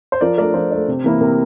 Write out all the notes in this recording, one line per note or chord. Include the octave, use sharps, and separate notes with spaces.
C5
F3 A#4 D5
A3 D4 A#4 D5
F3 A4 C5
A3 D4
C3
E3 A#3 E4
C3 A#4